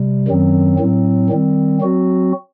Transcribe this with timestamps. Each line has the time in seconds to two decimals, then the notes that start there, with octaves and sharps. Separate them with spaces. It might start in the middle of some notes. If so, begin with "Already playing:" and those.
Already playing: C3 G3
0.28 F#2 D#3 F#3 C4
0.79 A2 F#3 C4
1.30 D#3 G3 C4
1.81 F#3 C4 F#4